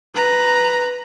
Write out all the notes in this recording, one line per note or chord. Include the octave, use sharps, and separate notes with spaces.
B4 A#5